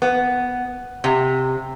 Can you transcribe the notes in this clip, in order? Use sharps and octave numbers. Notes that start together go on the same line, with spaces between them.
B3
C3